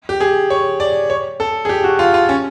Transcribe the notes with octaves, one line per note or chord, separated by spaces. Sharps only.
G4
G#4
C#5
D5
C#5
A4
G#4
G4
F#4
F4
F4
C#4